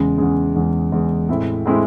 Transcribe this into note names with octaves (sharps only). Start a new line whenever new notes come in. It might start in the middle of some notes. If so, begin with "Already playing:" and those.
Already playing: E2 C#3 G#3
E2 C#3 G#3
E2 C#3 G#3
E2 C#3 G#3
A2 G#3 C4 E4
A2 G#3 C4 E4